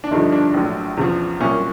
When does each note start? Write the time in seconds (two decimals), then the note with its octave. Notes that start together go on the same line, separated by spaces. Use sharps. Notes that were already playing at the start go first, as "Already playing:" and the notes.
0.04 D4
0.11 G1 G2 D3 F3 D#4
0.32 D4
0.54 A#1 A2 F#3
0.97 E2 C#3 F3
1.41 C2 A#2 F#3 C#4